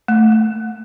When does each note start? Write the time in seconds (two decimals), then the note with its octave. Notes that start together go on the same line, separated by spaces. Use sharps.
0.08 A3
0.32 A3